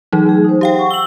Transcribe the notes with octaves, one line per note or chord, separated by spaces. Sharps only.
E3 F#3 D#4 G#4
A3 G#4
D#4 C5
G4 F5 G5
F#5 C#6
E6 F#7 G7